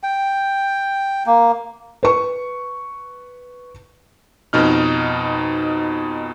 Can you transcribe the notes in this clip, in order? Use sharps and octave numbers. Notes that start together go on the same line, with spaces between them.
G5
A#3
B4 C#6
F2 B2 D#4 F6